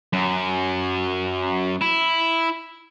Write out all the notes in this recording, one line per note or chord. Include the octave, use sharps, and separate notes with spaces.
F#2
E4